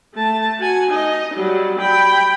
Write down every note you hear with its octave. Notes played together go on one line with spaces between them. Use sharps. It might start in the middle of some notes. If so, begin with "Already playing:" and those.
A3 A5
F#4 G#5
D#4 D#5
F#3 G3
G5 B5